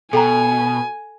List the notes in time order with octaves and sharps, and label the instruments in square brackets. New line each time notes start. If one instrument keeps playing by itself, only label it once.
[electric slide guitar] B2 [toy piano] A4 G5 A#5 [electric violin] G#5